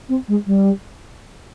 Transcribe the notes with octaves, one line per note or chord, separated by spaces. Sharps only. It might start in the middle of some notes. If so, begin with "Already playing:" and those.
C4
G#3
G3